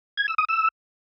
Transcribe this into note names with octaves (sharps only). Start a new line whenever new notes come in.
G#6
E6
D#6
E6